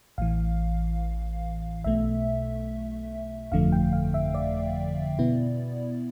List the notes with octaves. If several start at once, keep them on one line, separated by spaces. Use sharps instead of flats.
A1 A2 E3 F5
B1 B2 A3 E5
G1 F2 D3 F3 A3 F5
G5
F5
E5
D5
B2 B3 E4